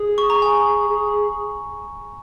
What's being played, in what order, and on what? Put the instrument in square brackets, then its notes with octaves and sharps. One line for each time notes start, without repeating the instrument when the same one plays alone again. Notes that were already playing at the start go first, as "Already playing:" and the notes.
Already playing: [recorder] G#4
[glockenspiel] C#6
A#5
G#5
[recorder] G#4